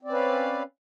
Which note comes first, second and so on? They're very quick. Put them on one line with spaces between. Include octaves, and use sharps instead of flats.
C4 D5 C#4 B4 F5